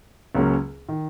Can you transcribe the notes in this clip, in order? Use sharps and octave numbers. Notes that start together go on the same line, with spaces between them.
C#2 C#3 F#3 A#3 C#4
D#3